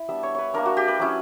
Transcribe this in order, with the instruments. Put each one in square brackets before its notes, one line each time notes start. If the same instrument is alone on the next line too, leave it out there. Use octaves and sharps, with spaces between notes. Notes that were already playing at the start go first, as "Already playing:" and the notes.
Already playing: [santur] E4
G3 B3 D4 E5
C#5
B4 C#5
A#3 D4 A#4
F#4
G4
B4
F#3 C#4 E4